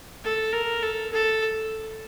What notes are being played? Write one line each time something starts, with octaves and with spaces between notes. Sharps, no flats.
A4
A#4
A4
A4